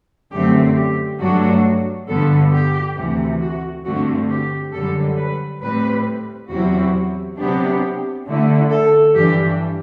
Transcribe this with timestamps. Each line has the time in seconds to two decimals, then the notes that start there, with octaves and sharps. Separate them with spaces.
0.31 F#2 D3 A3 C4 G4
0.75 G4
1.19 G2 F#3 A3 D4 F#4
2.08 G2 D3 G3 B3 A4
2.52 G4
2.95 D2 C3 E3
3.41 F#4
3.85 G2 D3 A3 C4 F#4
4.29 G4
4.72 F#2 D3 G3 A4
5.17 B4
5.61 A2 G3 C4 B4
6.49 E2 C3 F#3 C4 E4 F#4
7.38 C3 F#3 B3 D4 G4
8.26 D3 A3 E4
8.69 A4
9.14 G2 E3 G3 D4 G4